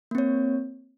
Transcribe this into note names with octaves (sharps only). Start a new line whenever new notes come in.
A#3 C4 C#5